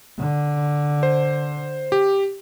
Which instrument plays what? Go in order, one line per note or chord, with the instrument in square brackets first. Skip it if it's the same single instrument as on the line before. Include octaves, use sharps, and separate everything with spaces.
[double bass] D3
[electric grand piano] C5
G4